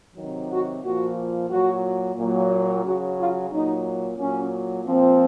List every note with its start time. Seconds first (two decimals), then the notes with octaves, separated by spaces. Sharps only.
0.15 C3 D#3 F#3
0.49 F#4
0.82 A#2 F3 F#4
1.49 A#2 F#3 F#4
2.16 A#2 F#3
2.83 C#3 F#3 F#4
3.17 F4
3.50 A#2 F#3 D#4
4.17 A#2 F#3 C#4
4.85 A#2 F3 C4